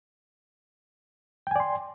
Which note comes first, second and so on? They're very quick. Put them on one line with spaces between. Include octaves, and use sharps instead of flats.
G5 G#5 D5 C6